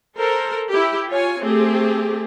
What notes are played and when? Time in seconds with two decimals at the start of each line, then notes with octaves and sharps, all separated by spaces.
0.17 A4 A#4 C5
0.71 E4 G4
1.10 F4 C#5 G#5
1.42 A3 C4 G4 G#4